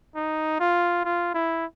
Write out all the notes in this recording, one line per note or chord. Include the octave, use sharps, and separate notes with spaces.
D#4
F4
F4
E4